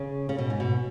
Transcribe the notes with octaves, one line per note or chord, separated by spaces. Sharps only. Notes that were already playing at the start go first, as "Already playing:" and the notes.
Already playing: C#3
C#3
B2
G#2
B2